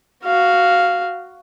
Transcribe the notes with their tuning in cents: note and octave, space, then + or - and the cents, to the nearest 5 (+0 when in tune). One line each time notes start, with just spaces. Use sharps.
F#4 +5 F5 +0